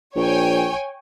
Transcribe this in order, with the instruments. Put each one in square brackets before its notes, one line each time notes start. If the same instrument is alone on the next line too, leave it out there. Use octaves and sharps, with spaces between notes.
[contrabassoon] A#1 [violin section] C#5 G5 G#5